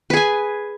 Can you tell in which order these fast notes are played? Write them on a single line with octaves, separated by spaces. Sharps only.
B4 G#4 G#5